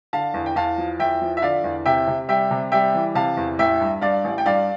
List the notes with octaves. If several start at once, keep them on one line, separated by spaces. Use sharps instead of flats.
D3 F5 A5
E2
G5
E2 F5 A5
F3
E2 E5 G5
F3
E5
D3 D5 F5
E2
C3 E5 G5
C3
G3 E5 G5
C3
G3 E5 G5
E3
C3 F5 A5
E2
A1 E5 G5
G2
G2 D5 F5
A1
G5
G2 D5 F5